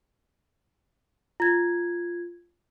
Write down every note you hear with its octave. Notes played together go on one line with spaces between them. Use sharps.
F4 G#6